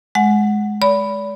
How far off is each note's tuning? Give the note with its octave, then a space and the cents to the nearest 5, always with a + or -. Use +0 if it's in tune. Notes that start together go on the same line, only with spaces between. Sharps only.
G#3 +15 F#5 +0
D5 -40 B5 +0